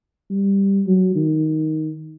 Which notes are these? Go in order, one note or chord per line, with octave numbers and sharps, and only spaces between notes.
G3
F#3
D#3